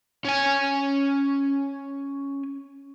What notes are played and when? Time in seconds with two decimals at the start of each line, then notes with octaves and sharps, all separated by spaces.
0.25 C#4 G#5